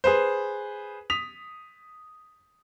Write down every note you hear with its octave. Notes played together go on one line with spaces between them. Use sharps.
G#4 B4 C5
D#6 B6 F7